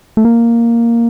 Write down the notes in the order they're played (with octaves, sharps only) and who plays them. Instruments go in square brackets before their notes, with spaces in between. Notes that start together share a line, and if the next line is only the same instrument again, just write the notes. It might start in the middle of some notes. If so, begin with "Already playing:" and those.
[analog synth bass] A3
A#3